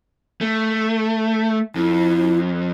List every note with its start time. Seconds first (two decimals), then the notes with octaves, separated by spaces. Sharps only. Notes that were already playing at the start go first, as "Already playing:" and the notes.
0.41 A3
1.75 F2 E4